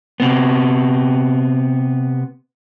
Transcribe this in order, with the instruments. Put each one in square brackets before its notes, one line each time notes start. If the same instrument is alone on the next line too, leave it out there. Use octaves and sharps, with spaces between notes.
[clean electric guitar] C3 B3